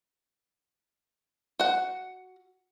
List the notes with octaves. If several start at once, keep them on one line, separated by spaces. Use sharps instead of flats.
F#4 F#5